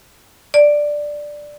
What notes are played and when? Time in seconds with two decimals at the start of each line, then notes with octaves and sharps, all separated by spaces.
0.54 D5